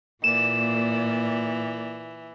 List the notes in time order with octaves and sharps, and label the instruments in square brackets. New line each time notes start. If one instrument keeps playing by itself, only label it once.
[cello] A#2 [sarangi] E3 [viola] A#3 D5 [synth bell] E7